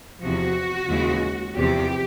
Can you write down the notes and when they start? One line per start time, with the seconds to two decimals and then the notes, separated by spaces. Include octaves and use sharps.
0.22 E2 C3 F3 F#4
0.89 D#2 C#3 E3 G#3
1.55 E2 C3 F3 G4